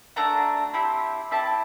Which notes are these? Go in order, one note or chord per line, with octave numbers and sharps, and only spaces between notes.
A3 D4 F#4 A#5
C4 E4 G4
C4 E4 G4 A5